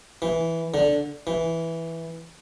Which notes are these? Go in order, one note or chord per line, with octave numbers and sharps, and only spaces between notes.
E3
D3
E3